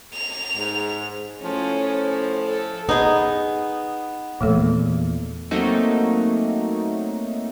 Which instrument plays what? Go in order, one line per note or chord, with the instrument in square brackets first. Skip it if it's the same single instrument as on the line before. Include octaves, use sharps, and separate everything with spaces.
[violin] F7
[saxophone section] G#2
[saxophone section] A2 F3 [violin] C#4
[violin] A4
[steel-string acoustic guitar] B3 [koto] D#4 G#4
[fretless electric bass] E2 A#2 [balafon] F3 A3 A4
[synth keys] F#3 A3 A#3 C4 D#4 F#4